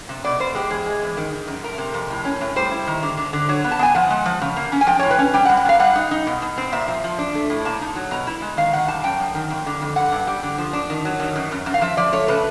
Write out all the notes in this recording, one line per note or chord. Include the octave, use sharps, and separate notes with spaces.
C3
B2 D5
B2 C5
G#3 G4
E2 G#4
G#3
E2
D#3
D#3
F#2
A3 A#4
C3
F2
A2
C#4
A2
G3 C5
E4
D#3
D3
D3
D3
F#3 C#5
B3
A5
B3 G#5
F3 F#5
G#3
F3
C#3
A#3
C#4
G#5
F3 G5
A2 C#5
B4
C#4
G3 G5
F#5
G3
F#5
A#2 F5
G3 F#5
D#4
D#4
B2
B2
C4
A#2 E5
F3
F3
D4
A3
A2
A#2 A5
D#4
F#3
B2 A#5
E4
G#3
D#3 F5
D#3 F#5
G3 A5
F#2 G5
F#2
D#3
F2
D3
F2
G2 F#5
G2
G3
D3
F3
D4
D#3
F#3
D#3
F#2
F#2
F#2
F5
F3 E5
F3 D5
A3 C#5
C#3 B4